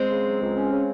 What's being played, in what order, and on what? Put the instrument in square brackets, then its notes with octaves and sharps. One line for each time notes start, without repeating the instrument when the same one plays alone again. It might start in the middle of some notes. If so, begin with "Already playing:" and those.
Already playing: [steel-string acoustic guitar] G#3 C4
[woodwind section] C#3
F#3
C#2
C#4
C#3